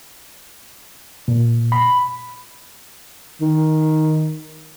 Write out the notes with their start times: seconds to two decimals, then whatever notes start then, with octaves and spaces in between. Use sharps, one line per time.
1.28 A#2
1.72 B5
3.41 D#3